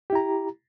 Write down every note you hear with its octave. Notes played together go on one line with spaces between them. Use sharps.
E4 G4 A#5